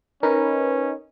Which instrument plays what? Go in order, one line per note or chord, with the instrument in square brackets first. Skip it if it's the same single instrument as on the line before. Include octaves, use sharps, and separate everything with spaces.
[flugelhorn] C#4 [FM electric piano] D#4 B4 D#5 [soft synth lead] A#4